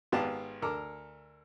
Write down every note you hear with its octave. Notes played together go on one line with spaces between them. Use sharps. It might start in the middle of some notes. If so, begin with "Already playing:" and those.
G#1 B3 G4 F5 G5 A5
D2 A4 A#4 D6 F6